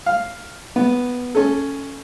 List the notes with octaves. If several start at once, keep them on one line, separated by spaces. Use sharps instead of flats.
F5
B3
C#4 A4